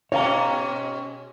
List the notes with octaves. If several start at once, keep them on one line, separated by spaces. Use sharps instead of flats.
G#2 B2 C#4 C#5 F5 A#5